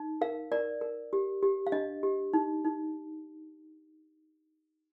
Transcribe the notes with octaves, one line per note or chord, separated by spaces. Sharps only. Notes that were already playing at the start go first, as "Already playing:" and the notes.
Already playing: D#4
A#4 F5
A#4 D5
A#4
G4
G4
F5
D4 D#5
G4
D#4
D#4